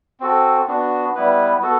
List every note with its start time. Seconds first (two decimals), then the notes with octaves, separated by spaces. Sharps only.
0.20 C4 F#4 A4
0.68 B3 D4 F#4
1.15 G3 B3 E4 B4
1.61 B3 F#4 A4